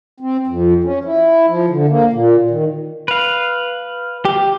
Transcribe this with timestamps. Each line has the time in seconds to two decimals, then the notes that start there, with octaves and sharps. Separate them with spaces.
0.20 C4
0.47 F2
0.84 C#4
1.05 E4
1.48 F3
1.70 D3
1.89 A#3
2.13 A#2
2.50 D#3
3.08 B4 F5
4.25 G4